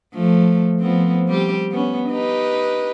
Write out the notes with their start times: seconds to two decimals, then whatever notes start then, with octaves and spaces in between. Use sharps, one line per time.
0.14 F3 A3
0.79 F3 B3 C4
1.28 G3 C4 G4
1.71 B3 C#4
2.09 D#4 G4 B4